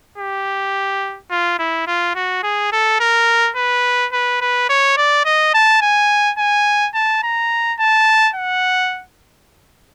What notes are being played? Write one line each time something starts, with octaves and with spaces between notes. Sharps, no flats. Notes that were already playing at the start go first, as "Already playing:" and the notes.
G4
F4
E4
F4
F#4
G#4
A4
A#4
B4
B4
B4
C#5
D5
D#5
A5
G#5
G#5
A5
A#5
A5
F#5